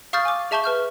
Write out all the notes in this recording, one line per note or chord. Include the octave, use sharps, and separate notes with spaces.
F5 C#6 D#6 F6 G6 A6
G#5 D6
G#4 E5 A5 C#6 G6 G7
B4 F6 G6